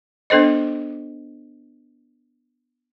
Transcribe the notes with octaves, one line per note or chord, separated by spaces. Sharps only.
B3 D4 A4 C5 D#5